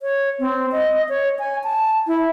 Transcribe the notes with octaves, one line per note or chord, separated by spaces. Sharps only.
C#5
C4
D#5
C#5
G#5
A5
E4